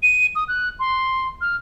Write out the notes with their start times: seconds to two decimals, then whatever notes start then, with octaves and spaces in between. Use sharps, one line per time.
0.03 D#7
0.36 D#6
0.48 F#6
0.80 C6
1.41 F6